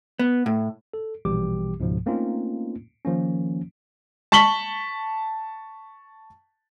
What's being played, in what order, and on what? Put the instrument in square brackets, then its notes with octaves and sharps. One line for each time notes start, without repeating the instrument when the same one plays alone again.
[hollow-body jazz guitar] B3
A2
[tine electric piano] A4
A#1 B2 E3 G3 G4 D6
C#2 G#2 B2 F3
A3 A#3 C4 C#4 D#4 F4
D#3 F3 A#3 C#4
[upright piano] A5 C#6 B6 F#7 G7